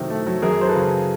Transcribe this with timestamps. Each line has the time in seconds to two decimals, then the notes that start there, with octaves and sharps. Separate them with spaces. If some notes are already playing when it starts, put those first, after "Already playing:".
Already playing: C3 D#3 F#3 A3
0.10 A3
0.27 F#3
0.42 F#2 G#4 A#4
0.60 F#3 C5
0.68 A4 B4
0.76 C#3